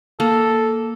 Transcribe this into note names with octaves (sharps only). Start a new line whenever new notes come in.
A#3 A4